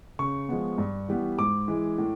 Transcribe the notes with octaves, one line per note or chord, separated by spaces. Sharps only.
C#3 C#6
F3 G#3 B3
G2
E3 G3 B3
G#2 D6
E3 G#3
A2